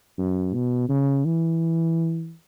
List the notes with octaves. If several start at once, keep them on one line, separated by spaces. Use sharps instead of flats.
F#2
B2
C#3
E3